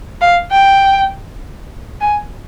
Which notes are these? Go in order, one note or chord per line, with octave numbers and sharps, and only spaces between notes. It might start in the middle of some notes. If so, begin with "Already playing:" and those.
F5
G5
G#5